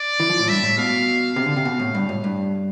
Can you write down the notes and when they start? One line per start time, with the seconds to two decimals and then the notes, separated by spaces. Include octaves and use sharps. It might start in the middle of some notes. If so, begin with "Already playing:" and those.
Already playing: D5
0.20 E3
0.30 F3
0.40 A2
0.49 G2 E5
0.63 A2
0.78 B2 F5
1.36 C3 F5
1.46 D3
1.56 C3
1.65 B2
1.79 A2
1.95 G2
2.09 A2
2.24 G2